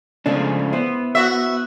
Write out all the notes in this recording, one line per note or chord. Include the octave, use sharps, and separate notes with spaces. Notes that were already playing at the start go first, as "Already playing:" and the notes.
C#3 F3 G#3 A3 D4 G#4
B3 E4 C5
F#4 E5